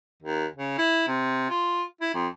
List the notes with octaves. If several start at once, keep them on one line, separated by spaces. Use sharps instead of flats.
D#2
C#3
E4
C3
F4
E4
F2